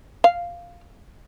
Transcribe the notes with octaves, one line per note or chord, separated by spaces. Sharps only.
F5